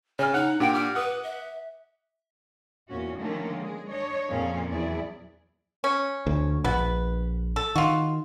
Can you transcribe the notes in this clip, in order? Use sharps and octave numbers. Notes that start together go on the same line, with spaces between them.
C#3 C#5 G#5 F6
D#4 F#5 F#6
A#2 D4 G4 F#5 G5 D7
D6 F6
B4 F#5 D#6
E5
E2 A#2 C#4 F#4
D3 D#3 F3 A3 A#3 C#4
G#3 G#4
D4 C#5 D#5
F2 A#2 C4 C#4 G#4 F5
E2 F#3 E4 G#4 D5
C#4
D2
A#1 B3 B4
A4
D#3 F4 F#4